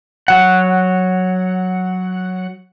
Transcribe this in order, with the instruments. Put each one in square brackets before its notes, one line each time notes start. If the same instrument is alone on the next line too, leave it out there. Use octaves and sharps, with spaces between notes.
[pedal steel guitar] F#3 F#5